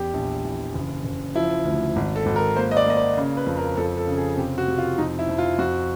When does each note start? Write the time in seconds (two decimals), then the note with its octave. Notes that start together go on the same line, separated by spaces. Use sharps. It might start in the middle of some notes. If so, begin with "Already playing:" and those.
Already playing: E2 G4
0.14 A#1
0.45 E3
0.74 F#1
1.04 F#1
1.35 F3 E4
1.65 D2
1.96 G#1
2.16 A4
2.26 G#1
2.36 A#4
2.56 A#3 C5
2.71 D#5
2.77 D5
2.86 A#3 D#5
2.97 D5
3.17 C#3
3.37 B4
3.46 F2
3.57 A#4
3.77 F2 A4
3.97 A4
4.07 C#3
4.18 G#4
4.37 C3 G4
4.58 F#4
4.68 C3
4.78 F4
4.98 F2 D#4
5.19 E4
5.29 F2
5.38 F4
5.58 F2 F#4